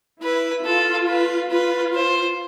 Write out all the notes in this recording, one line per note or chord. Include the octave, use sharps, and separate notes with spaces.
E4 B4
F4 A4
B4
F4 B4
C5